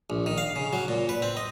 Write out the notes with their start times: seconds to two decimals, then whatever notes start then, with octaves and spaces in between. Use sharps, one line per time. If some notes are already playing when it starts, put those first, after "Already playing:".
0.10 A#1
0.26 D#3
0.38 F5
0.56 C#3
0.73 F#3
0.88 A#2
1.09 B4
1.22 C4
1.37 D#5